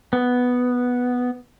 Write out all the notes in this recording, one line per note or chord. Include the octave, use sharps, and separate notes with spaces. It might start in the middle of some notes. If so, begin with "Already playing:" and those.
B3